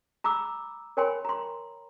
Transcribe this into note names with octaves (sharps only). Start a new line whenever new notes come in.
A#5 B5 D6 E6
A#4 C#5 G5 G#5 B5 C6
A#5 C6